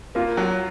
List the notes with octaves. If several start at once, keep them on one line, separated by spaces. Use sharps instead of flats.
A#3 F4 F5
F#3